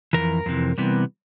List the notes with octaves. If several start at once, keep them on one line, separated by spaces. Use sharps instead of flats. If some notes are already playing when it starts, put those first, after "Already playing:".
F2 C3 E3 A#4
F2 C3 E3
C3 E3 G3 B3